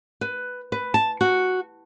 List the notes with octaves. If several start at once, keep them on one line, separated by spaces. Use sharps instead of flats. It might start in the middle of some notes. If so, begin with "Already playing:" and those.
B4
B4
A5
F#4